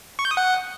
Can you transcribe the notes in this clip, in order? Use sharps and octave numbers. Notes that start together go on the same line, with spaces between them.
C#6
G6
D#6
F#5